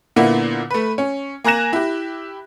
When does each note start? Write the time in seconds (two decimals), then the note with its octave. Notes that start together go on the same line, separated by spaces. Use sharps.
0.16 A#2 D3 A#3 B3 E4
0.71 A3 B4
0.98 C#4
1.44 A#3 G#5 A#5 F#6 A#6 E7
1.73 E4 G4